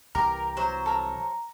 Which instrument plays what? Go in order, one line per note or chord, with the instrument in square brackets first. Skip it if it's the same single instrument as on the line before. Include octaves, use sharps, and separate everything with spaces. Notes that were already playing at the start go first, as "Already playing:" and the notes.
[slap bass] C2 C3 E3 [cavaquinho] G4 [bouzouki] A#4 [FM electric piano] A#5
[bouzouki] F#3 C5
[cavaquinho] A4 A#4